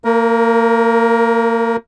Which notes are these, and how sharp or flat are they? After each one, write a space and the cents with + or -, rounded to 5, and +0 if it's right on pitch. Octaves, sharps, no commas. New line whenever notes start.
A#3 -30 A#4 +15